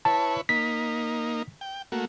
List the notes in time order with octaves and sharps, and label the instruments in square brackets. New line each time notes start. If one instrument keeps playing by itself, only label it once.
[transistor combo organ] E4 B4 C#5 [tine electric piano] A5
[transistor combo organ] A#3 D#4 [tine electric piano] B6
[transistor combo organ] G5
A3 A#3 F#4